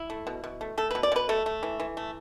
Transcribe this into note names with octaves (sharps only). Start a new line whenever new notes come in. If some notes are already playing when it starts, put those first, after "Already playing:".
Already playing: E4
A3
B2
B2
A3
A3 A4
B2 B4
D5
B2 B4
A3 A4
A3
E3
E3
A3